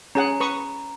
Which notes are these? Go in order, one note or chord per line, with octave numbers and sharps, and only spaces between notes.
C#4 G#4 F#5 A#5
B4 C#6 D#6